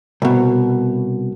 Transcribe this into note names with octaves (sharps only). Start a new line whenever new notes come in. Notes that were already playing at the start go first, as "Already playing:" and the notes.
C2 B2